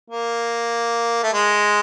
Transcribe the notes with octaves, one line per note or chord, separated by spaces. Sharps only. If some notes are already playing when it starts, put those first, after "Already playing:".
A#3
A3
G#3